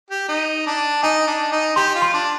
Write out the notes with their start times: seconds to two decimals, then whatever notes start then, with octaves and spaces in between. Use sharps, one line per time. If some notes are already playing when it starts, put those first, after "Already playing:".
0.10 G4
0.29 D#4
0.66 D4
1.03 D#4 G#5
1.27 D4
1.52 D#4
1.76 G4 C6
1.95 F4
2.02 C6
2.14 D4